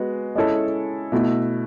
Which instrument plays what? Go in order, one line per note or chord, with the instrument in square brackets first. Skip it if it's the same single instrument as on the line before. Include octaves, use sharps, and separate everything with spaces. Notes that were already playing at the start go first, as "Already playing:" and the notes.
Already playing: [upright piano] G#3 B3 F#4
G#3 C#4 E4 A4
B2 A3 E4